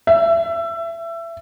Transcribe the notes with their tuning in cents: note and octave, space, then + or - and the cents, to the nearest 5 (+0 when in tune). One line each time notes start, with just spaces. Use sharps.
E5 +25